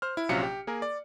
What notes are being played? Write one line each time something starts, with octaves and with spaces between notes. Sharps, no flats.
C5 F6
E4
A#1 C3 F#3 C#4 F4 C#7
G4
A#3 G#4 A#4
D5